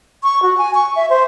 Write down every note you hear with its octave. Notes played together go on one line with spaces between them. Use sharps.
C#6
F#4
G#5
C#6
E5
C5